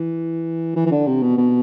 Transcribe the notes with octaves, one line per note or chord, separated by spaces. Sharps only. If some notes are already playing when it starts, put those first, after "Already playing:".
Already playing: E3
E3
E3
D3
C3
B2
B2